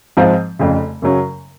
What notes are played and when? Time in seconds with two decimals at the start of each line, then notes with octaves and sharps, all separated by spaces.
0.17 G#2 F3 C4 F4
0.59 F1 F2 C#3
1.02 F#2 C#3 F#3 C#4